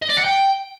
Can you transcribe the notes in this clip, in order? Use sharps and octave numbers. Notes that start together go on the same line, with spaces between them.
D#5
D5
F#5
G5